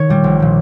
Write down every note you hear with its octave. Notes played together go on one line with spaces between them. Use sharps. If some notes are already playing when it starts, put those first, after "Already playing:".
Already playing: D#3 C#5
A#2 G3
A#1
A#2 G3